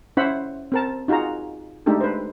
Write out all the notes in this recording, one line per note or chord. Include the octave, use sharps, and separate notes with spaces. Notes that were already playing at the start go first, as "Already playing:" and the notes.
C#4 E4 C5 E5 F#5 B5
C4 A#4 A5
D#4 F4 F#4 G#4 A#5
G#3 A3 D4 D#4 G4 A4
B4 C5